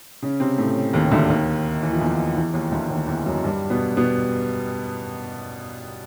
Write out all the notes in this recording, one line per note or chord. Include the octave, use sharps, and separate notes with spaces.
C#3 C#4
C3 C4
A2 A3
D#2 D#3
D2 D3
D#2 D#3
E3
F3
E2 E3
E2 E3
D#2 D#3
D2 D3
D#2 D#3
E2 E3
F#2 F#3
G2 G3
B2 B3
B2 B3